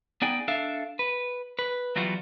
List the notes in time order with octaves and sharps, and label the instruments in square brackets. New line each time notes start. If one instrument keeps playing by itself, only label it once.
[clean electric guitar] B3 D#4 G#4 D5 G5 G#5
D4 A4 E5 F5
B4
B4
E3 F#3 G3 B3 F4 F#4